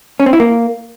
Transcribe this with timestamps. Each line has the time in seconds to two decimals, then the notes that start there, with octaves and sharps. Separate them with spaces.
0.20 C#4
0.26 C4
0.33 E4
0.40 A#3